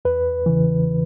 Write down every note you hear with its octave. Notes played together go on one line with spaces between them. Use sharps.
E2 B4
C#3 E3